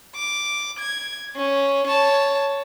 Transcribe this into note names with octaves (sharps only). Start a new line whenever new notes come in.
D6
G#6
C#4
C#5 A5